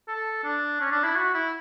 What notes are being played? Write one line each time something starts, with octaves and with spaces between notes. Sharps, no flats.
A4
D4
C#4
D4
E4
F#4
E4